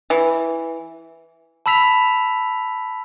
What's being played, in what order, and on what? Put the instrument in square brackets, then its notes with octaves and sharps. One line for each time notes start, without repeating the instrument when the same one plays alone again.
[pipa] E3
[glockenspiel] A5 B5 E6 B6 F7